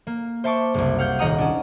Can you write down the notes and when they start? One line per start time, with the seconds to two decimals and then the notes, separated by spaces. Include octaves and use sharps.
0.07 A#3
0.44 C5 E5 A5 C#6 D6
0.74 F#1 C2
0.99 F5 F#5 F6 G6
1.19 D#1 D#5 F#5 A#5 D#6
1.38 C#4 D4